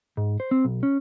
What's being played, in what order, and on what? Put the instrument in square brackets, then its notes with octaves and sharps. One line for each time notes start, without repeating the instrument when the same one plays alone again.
[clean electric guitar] G#2
C5
C4
B1
C#4